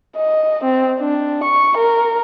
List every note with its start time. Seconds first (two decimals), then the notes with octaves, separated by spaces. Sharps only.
0.16 D#5
0.64 C4
0.99 D4
1.44 C#6
1.77 A#4